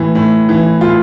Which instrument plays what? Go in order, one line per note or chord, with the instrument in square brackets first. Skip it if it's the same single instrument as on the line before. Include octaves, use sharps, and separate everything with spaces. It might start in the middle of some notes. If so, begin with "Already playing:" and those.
Already playing: [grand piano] A2 E3
A2
E3
A2 F4